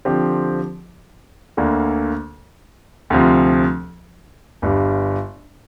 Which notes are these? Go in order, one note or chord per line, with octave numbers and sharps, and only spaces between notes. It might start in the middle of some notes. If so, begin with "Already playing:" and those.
D3 F3 C4 G4
D2 D3 A#3
D2 C3 F3
G1 G2 G3